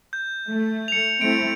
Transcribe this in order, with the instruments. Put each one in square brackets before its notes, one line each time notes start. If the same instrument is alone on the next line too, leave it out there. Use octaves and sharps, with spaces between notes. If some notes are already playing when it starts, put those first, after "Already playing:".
[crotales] G6
[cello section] A3
[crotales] C#7 F7
[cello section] A3 C4 E4 [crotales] C#7 D7